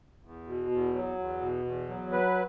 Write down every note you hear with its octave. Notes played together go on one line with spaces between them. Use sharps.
E2
B2
E2
F#3
E2
B2
E2
F#3
B4